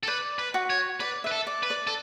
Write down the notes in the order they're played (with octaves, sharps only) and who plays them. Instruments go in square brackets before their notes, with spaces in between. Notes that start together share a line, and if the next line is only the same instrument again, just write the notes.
[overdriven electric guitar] A4
[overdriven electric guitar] B4 [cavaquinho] D5
[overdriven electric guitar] B4
[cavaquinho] F#4
[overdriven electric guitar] C#5
[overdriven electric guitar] B4 [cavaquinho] D5
[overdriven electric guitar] B4 [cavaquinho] E5
[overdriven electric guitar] A4
[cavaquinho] D5
[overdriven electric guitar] B4
[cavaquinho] D5
[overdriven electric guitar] A4